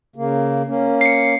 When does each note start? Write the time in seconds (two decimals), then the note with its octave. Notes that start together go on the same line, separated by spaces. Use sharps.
0.16 C#3 A#3
0.67 A#3 C#4
1.01 C7 C#7